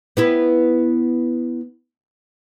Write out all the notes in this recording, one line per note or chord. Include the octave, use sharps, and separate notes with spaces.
B3 E4 B4